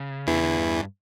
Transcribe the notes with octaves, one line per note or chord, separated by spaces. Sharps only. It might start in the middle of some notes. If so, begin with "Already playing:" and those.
Already playing: C#3
E2 D3 E3
C#3
D3
G2